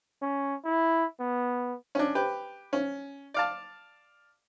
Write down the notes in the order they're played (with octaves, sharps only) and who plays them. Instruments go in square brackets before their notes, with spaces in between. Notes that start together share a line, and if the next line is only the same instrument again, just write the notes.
[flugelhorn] C#4
E4
B3
[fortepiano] C#4 D4
G4 B4
C#4
D5 F5 A5